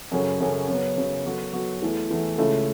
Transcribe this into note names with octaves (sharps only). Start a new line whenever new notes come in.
F#2 C#3 F#3 C#4 A4
F#2 C#3 F#3 C#4 A4
C#3 F#3 B3
C#3 F#3 B3
F#3 B3 F#4 A4
F#3 B3 F#4 A4
E2 E3 A3
E2 E3 A3
C#2 C#3 A3 E4 A4